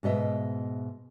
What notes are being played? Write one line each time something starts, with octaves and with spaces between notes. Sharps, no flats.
G#2 B2 D#5 E5